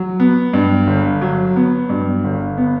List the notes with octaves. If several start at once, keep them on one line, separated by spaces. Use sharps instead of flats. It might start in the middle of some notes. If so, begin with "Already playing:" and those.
Already playing: F#3
B3
G2
G1
F#3
B3
G2
G1
B3